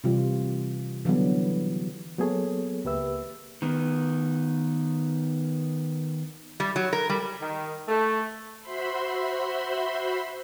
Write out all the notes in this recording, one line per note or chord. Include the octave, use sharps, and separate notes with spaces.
C3 E3 G3 F4 G4
D3 E3 F#3 G3 B3
F#3 A#3 B3 G#4 A4 C#5
C#2 A#3 G4 B4 E5 E6
D#3 B3
G3
F#3
A#4
G3
D#3
A3
F#4 C5 E5 B5 C6